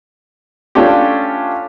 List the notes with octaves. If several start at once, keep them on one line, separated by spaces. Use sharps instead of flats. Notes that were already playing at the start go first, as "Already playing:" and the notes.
A3 C#4 D4 F4 G4